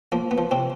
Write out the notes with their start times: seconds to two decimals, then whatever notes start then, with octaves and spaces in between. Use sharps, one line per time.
0.12 F3 A#3
0.31 B3
0.38 F3
0.51 C3 C4